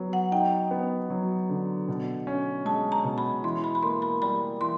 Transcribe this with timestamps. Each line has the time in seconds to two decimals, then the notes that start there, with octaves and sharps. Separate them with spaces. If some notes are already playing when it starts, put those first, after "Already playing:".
Already playing: F#3 B3
0.13 F#5
0.32 D#4 G5
0.71 B3
1.10 F#3
1.50 D3
1.88 B2
2.27 C#4
2.65 G#3 A5
2.92 A#5
3.04 B2
3.18 B5
3.43 E3 C6
3.64 B5
3.75 B5
3.83 A#3 C6
4.02 B5
4.22 G3 B5
4.61 E3 C6